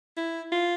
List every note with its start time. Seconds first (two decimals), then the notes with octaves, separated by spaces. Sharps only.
0.17 E4
0.52 F4